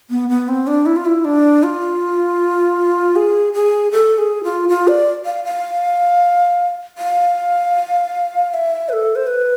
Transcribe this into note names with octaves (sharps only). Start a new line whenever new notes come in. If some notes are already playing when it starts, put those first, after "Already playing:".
B3
B3
C4
D4
E4
F4
E4
D4
F4
G#4
G#4
A4
G#4
F4
F4
D5
F5
F5
F5
F5
E5
B4
A4
C5
B4